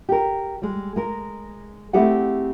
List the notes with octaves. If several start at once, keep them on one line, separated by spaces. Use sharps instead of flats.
G4 A#4
G3 G#3
G#3 A#4
A3 C4 E4 G4 G#4 F#5